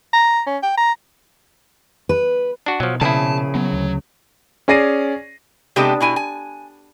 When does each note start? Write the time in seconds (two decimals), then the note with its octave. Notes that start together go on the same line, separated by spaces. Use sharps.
0.13 A#5
0.47 C#4
0.63 G5
0.78 A#5
2.09 B4
2.66 D4 F#4
2.80 B2 F3 F#3
3.01 A#1 C#3 E4 A5
3.55 F#3 B3
3.73 D2
4.68 C#4 G#4 D5 A#6 C7 D#7
5.76 C3 G#3 B3 D4 G4 A4
6.01 B2 E4 G#5
6.16 G#5